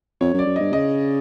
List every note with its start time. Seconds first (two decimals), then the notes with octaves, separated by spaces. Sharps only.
0.21 F2 C#5
0.34 F#2
0.39 D5
0.46 F#2
0.56 G2 D#5
0.73 C#3 D#5